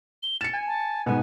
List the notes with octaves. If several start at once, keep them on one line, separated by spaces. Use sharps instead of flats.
G7
A6 C#7 E7
G#5
A5
G#2 B2 B3 G#5